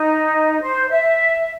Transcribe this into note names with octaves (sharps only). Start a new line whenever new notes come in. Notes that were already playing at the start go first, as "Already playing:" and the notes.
Already playing: D#4
C5
E5